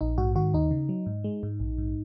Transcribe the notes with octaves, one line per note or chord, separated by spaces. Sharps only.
A#1 D#4
G#2 F#4
D#3 F#4
D#2 D#4
C#3
F#3
G#2
G#3
G#2
A#1
G#2